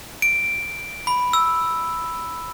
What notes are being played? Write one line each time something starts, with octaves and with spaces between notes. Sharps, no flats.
D7
B5
E6